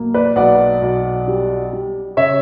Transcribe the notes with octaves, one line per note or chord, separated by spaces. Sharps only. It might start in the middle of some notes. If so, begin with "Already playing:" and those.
Already playing: B1 A#3
B4 D5
B1 D5 F#5
B1
G3
G3
C#3 C#5 E5